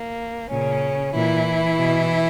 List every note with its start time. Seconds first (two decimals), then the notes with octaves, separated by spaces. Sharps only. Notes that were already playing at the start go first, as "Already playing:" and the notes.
Already playing: A#3
0.49 A#2 C#3 C#4
1.14 A#2 E3 E4
1.79 B2